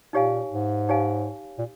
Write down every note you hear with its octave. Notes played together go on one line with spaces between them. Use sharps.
A#2 D#4 G4 C#5 F5 G#5
G#2
D#4 G4 C#5 F5 G#5
A#2